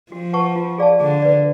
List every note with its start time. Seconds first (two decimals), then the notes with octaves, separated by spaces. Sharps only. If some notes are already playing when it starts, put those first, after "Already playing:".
0.12 F3 F#4
0.33 B4 F#5 A5 C#6
0.56 F4
0.78 G#4 D5 F5 A5
1.00 D3 G#4
1.22 B4 D5